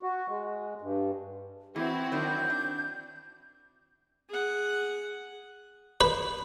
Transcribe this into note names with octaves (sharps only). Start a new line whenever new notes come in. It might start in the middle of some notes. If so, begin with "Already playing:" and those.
F#4
G#3
G2
E3 C4 E4 F#4 G#6
D#3 F#3 D4 G6
D4
G#4 F#5
B4